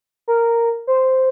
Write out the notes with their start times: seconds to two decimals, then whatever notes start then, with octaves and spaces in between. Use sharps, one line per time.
0.28 A#4
0.87 C5